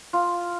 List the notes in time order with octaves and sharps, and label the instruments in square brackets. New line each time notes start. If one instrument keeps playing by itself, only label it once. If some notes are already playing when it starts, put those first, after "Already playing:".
[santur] F4